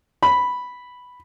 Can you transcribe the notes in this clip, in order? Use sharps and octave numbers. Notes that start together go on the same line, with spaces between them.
B5